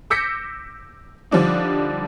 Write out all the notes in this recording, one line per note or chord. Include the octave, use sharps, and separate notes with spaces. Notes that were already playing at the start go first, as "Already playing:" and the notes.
D6 E6 G6 A#6 B6 C#7
D3 F3 G3 D4 D#4